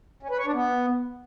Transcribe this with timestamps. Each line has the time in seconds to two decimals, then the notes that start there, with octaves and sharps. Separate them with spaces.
0.23 C#4
0.31 B4
0.38 C#5
0.46 D4
0.54 B3